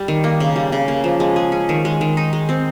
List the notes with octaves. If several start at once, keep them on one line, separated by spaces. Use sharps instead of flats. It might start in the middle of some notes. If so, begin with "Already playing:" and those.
Already playing: G3
D#3
A#3
C#3
G3
C#3
A#3
F3
G#3
G#4
C#4
D#3
G#3
D#3
D#4
G#3
C4